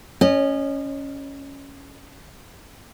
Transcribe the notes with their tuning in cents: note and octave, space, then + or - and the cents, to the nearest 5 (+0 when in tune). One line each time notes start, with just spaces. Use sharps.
C#4 +0 D#5 -30